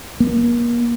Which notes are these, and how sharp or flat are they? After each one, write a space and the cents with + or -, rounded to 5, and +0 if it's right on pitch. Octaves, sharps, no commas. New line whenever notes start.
A#3 +35